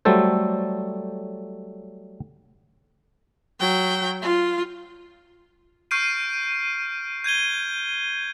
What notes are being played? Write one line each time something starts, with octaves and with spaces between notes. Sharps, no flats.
F#3 G3 A3 A4 C5
F#3 G5
F4
C#6 F6 G6 C7 D7 D#7
G6 G#6 D#7 G7